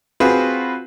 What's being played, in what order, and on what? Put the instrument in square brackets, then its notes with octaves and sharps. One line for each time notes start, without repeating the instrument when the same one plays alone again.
[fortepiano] C4 F4 F#4 G#4 B4